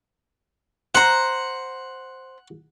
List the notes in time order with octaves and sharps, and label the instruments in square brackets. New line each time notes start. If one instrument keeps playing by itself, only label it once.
[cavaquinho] C5 A#5 [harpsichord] F#5